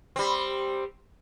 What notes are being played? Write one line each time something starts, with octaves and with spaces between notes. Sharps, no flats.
G3 C4